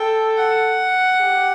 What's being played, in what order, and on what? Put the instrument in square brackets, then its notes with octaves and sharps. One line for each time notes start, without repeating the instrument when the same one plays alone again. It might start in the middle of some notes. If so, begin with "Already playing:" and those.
Already playing: [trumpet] A4 [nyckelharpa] G5
[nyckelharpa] F#5
[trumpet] G4